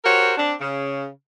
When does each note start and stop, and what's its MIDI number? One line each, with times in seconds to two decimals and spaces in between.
0.05 0.34 66
0.05 0.34 67
0.05 0.34 70
0.05 0.34 72
0.05 0.34 73
0.38 0.54 60
0.38 0.54 62
0.61 1.08 49